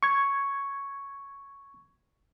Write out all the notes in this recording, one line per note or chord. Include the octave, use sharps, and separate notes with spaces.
C#6 G#6